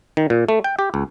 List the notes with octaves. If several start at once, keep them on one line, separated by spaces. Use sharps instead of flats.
D#3
A#2
A3
G5
G4
C#2